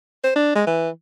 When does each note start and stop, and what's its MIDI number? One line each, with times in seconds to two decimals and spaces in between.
0.24 0.31 72
0.36 0.52 62
0.55 0.66 56
0.67 0.89 52